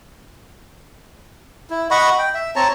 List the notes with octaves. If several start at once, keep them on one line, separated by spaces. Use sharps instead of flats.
E4
D#5 F#5 B5 C#6
G5
E5
C4 C#5 A5 A#5